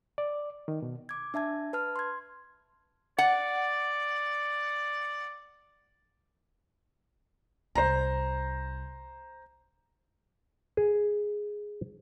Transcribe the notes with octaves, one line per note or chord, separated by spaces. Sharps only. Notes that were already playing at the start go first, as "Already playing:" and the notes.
D5
D#3
B2
D6 G#6
D4 E5 A5 G#6
B4 A5 F6
C6 G#6
D5 F#5
C2 C5 A#5
G#4